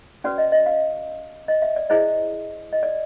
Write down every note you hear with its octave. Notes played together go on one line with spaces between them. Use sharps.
C#4 F#4 B4 D5
D#5
D#5
F5
D#5
E5
D5
E4 G#4 C5 D#5
D#5
D5